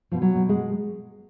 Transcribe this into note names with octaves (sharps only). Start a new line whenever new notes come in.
B2 F3
F#3
B2
G#3
B2